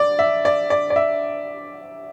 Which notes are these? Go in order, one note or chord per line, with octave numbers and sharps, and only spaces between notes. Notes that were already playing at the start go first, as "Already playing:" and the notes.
Already playing: D5
E5
D5
D5
D5
E5